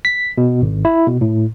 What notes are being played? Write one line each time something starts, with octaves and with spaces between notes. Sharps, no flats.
B6
B2
G#1
E4
B2
A2